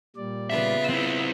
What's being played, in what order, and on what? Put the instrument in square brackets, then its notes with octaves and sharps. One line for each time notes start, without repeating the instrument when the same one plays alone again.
[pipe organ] A#2 G3 D5
[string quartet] C#3 B3 F4 [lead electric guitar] E5
[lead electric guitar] C4 E4 [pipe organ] E5